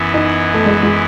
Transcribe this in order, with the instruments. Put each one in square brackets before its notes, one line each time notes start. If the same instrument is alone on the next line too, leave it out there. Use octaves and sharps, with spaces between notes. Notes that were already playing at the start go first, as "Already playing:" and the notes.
Already playing: [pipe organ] F#2 E3 B3 E4
[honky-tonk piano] D#4
A3
G#3
G#3